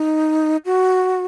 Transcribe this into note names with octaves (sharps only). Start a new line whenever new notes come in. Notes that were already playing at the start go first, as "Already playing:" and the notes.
Already playing: D#4
F#4